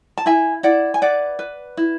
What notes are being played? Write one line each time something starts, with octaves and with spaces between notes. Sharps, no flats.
A5
E4 E5 G#5
E4 D5 F#5
G#5
B4 D5 F#5
B4
E4